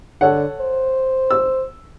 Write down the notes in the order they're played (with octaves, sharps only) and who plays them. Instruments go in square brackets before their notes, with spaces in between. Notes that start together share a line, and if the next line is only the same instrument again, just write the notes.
[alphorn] D3 [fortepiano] A4 C#5 F#5
[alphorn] C5
[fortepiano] E6